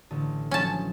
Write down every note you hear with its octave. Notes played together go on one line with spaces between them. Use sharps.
A1 D3 A5
F3 F#3 C#4 A5